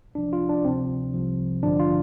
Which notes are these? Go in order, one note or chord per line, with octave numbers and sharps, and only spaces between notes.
C2 C3 F3 D4
F4
D4
D2 C3 F3 C4
C2 C3 F3
A1 G2 D3 F3 D4
F4